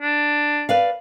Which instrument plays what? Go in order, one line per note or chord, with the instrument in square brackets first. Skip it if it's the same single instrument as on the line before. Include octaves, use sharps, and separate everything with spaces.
[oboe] D4
[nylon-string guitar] B4 D5 F5